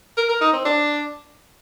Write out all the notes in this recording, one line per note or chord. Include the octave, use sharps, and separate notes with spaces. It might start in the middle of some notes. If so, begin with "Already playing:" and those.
A#4
A#4
D#4
C4
D4